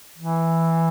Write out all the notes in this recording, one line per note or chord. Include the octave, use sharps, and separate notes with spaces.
E3